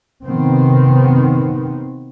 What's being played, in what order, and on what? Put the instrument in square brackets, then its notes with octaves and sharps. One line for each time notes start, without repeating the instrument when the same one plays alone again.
[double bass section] C3 D#3 B3 C4